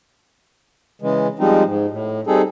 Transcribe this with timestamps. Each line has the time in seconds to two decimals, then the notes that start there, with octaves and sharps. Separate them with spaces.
1.02 C#3 E3 G#3
1.39 F3 G3 G#3 C4 D#4
1.65 G#2
1.90 A2
2.27 G3 C4 D#4 G#4 A4